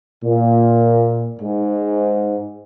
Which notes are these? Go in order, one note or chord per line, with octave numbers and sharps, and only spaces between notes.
A#2
G#2